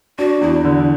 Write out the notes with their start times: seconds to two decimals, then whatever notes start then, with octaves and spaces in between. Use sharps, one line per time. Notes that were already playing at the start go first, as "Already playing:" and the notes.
0.19 D4 F#4
0.41 E2 E4
0.65 D3